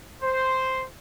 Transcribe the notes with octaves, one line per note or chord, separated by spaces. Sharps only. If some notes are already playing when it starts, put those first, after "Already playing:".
C5